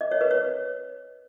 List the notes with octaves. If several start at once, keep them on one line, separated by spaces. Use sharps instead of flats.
D#5
C#5
B4
C#5